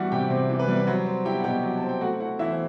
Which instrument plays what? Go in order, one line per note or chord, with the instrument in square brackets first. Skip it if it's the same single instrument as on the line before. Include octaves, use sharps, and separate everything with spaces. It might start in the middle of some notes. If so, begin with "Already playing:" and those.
Already playing: [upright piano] E3 G3 F#4 F#5
C3 G4 G5
C3 C5
E3
B4
G3
B4
F#3 C5
C4
E4 G4 G5
F#5
B2 G4 G5
F#3
C4 A5
G5
A3 F#4 F#5
E4 F#4 F#5
E3 E4 E5
C5